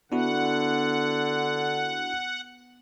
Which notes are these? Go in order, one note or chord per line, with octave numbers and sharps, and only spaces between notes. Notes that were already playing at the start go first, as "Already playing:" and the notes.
D3 B3 D4 E4 F#4 F#5